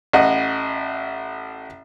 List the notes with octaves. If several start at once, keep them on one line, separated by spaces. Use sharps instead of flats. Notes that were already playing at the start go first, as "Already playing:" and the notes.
A1 D#5 F#5